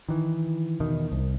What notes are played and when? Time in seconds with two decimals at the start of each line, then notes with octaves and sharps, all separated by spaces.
0.09 D#3 E3
0.80 E2 B2 D#3
1.12 C2